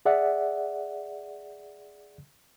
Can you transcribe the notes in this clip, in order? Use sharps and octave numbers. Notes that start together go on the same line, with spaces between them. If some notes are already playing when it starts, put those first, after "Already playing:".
G#4 D5 E5 F#5